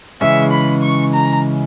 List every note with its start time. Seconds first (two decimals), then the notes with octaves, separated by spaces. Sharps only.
0.21 C#3 E3 G#3 C#4 E5
0.52 B5
0.83 C#6
1.14 A#5